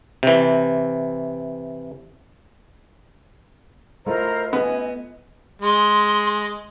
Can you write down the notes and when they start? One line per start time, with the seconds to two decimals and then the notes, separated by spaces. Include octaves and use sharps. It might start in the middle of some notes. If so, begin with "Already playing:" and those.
0.23 C3 E3
4.06 A3 E4 F4 A#4 C5 D#5 A#5
4.53 B3 G#5
5.62 G#3 C6